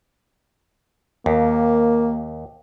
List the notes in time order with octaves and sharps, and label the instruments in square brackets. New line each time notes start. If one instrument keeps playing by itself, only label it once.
[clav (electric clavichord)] D#2 [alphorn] A#3